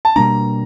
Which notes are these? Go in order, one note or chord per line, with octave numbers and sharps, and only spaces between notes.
A5
B2 G3 A#3 D4 A#5